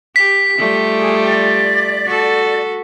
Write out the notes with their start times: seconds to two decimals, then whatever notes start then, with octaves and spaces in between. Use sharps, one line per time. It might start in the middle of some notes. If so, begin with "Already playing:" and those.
0.16 G4 B6
0.58 G3 A3 F4
0.96 G#4
1.25 D5
2.06 F#4 A4